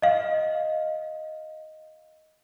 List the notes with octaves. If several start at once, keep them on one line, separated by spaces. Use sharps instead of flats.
D#5 F5